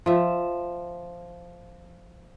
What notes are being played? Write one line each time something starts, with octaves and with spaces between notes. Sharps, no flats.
F3 E5